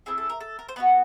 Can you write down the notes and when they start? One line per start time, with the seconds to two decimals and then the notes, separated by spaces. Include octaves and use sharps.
0.06 C4 E4 G#4 A4
0.18 A4
0.30 A#4
0.41 A4
0.59 A#4
0.68 C5
0.76 B3 D4 F#4 B4